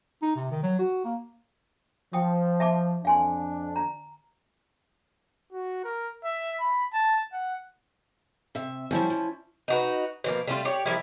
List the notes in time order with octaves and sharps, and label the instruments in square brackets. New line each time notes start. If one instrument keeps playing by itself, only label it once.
[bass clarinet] D#4
C3
D#3
F#3
F#4
A#3
[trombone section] F3 [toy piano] G5 D#6
[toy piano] E5 A5 D6
[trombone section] F2 D4 [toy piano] F5 G#5 C6
[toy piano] A#5
[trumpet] F#4
A#4
E5
B5
A5
F#5
[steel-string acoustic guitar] C3 E5
[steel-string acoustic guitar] F3 G3 [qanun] C#4 E4 E5
[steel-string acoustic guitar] F3
[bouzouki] D#4 F#4 B4
B2 F3 A#3
G3 A3 F4
G4 C#5 D5
F3 G3 A#3 E4